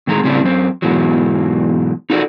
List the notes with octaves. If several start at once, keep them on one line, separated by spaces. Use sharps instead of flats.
A2 D#3 G#3 A#5
A2 C#3 G3 C4 D4
F#2 C4
G#2 B2 E3 F#3
D#4 F4 F#4 A4 D5